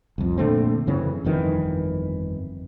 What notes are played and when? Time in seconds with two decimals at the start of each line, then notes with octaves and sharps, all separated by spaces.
0.18 C2 F2
0.38 A#2 D3 A3 C4
0.87 F#2 C#3 E3 C4
1.24 G1 F2 D#3 E3